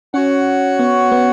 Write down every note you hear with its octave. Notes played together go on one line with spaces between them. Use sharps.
C#4 F#4 C#5 F#5
B3
B3